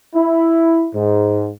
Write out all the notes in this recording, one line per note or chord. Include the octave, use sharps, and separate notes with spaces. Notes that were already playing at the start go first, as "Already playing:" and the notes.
E4
G#2